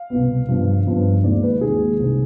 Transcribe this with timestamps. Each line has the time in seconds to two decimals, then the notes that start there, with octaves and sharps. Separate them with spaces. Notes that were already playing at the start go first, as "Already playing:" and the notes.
Already playing: F5
0.10 C2 B2 B3
0.48 G2 F3 B3
0.86 G2 F3 B3
1.24 D#2 D#3 G#3 D5
1.43 B4
1.61 D#2 D#3 G#3 G#4
2.00 C2 C3 D#3